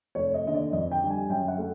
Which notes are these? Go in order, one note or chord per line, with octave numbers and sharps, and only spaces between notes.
F1 C#5
D#5
D#2 D3 D#5
D5
F2 D#5
G5
D3 G3
G#5
F#2 G5
F#5
A3